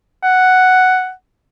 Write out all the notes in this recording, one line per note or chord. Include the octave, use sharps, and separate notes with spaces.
F#5